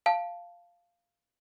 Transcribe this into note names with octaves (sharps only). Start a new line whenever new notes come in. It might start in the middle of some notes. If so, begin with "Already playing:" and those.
F5 A5